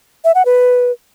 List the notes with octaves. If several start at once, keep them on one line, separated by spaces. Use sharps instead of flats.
E5
F#5
B4